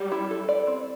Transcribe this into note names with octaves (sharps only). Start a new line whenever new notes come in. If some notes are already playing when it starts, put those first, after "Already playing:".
Already playing: G3
E4
A4
D5
C4